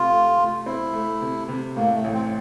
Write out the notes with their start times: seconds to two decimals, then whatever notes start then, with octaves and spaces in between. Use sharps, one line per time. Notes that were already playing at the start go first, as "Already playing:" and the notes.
Already playing: C3 A3 F4
0.11 A3
0.38 A3
0.66 C4 E4
0.93 A3
1.21 C3
1.48 C3
1.76 A2 A#3
1.95 A3
2.04 A1
2.14 C4